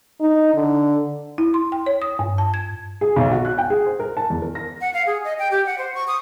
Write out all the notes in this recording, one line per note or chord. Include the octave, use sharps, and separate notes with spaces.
D#4
D3
E4
C6
G5
C#5
D#6
G2
A5
G#6
G#4
B1
F#4
F#6
G5
G#4
C5
A#4
A5
E2
A#4
A#6
F#5
F5
G#4
D#5
G5
G4
F#5
C5
C#6
D#6